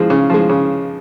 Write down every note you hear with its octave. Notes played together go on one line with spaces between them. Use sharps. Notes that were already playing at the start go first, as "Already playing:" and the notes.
Already playing: C#3 F3 G#3
C#3
F3 G#3
C#3